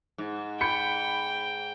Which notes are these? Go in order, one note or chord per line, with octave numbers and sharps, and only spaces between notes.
G#2
G5 B5 G6 C#7